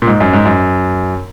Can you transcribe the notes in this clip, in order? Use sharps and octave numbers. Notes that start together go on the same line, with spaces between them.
A#2
G#2
F#2
G#2
F#2